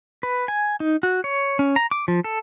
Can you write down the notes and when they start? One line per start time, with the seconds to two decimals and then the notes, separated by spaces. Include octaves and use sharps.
0.23 B4
0.48 G#5
0.80 D#4
1.03 F#4
1.24 C#5
1.59 C#4
1.76 A#5
1.91 D6
2.08 F3
2.24 A4